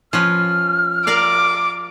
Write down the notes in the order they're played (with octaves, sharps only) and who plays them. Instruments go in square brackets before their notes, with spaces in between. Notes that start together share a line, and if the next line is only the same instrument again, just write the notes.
[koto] F3 C#4 B4 [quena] F6
[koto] A#4 D5 F5 [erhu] D6